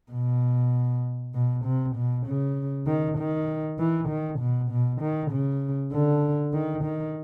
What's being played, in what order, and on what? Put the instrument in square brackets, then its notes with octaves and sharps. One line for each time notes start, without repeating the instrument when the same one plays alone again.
[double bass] B2
B2
C3
B2
C#3
D#3
D#3
E3
D#3
B2
B2
D#3
C#3
D3
D#3
D#3